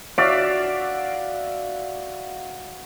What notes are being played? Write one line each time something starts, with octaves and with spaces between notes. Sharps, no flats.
F#4 D5 E5 F5